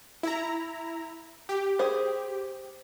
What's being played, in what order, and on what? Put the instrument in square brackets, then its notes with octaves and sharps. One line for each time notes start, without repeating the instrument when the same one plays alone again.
[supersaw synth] E4 A#5
G4
[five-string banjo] G#4 C5